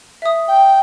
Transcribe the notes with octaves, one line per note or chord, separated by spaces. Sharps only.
E5 D#6
G5